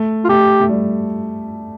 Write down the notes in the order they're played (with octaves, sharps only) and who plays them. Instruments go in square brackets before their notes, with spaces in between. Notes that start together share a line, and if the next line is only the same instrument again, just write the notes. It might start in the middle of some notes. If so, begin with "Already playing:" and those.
Already playing: [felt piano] A3
[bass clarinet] F4
[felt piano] A3 [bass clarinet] G4
[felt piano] A3
G3